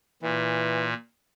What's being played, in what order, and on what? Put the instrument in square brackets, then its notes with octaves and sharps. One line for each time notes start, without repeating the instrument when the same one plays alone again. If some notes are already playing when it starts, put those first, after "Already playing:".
[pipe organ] A#2 [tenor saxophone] E3